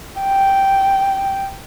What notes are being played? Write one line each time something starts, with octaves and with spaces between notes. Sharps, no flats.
G5